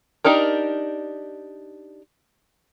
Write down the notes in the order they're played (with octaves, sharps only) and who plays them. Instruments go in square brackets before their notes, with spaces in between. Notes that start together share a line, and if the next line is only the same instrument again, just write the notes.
[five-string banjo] D4 D#4 G4 A#4